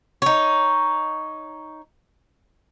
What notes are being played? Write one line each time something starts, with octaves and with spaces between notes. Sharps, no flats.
D#4 C#5